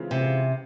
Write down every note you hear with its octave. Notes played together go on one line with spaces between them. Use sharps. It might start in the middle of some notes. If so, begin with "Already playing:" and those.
Already playing: C#3 E3 G#3 C4 F4
C3